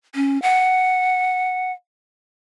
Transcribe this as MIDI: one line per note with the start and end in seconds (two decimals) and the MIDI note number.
0.15 0.40 61
0.42 1.72 78